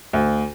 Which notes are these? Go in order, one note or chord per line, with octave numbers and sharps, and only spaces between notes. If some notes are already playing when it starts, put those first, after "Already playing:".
D2